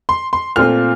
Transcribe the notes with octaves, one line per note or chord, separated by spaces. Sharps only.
C6
C6
A#2 A3 C4 F4 F6